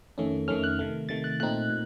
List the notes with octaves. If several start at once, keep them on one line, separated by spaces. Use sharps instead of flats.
F2 D#3 A3 C#4
F2 D#3 A3 C#4 F6
F#6
C3 D#3 A3
C3 D#3 A3 A6
F#6
A#2 A3 C4 D#4 F#6
A#2